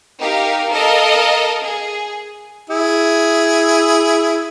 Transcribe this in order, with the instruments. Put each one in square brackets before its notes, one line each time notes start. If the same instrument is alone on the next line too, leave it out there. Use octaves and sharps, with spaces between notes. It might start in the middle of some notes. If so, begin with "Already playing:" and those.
[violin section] D#4 G4 A#4 F5
A4 A#4 D#5 F5
G#4
[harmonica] E4 G#4